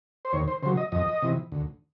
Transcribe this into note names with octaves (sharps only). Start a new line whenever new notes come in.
C5
D#2 C#5
C5
C#3 F#3 C5
D#5
F2 D#5
C3 E3
D2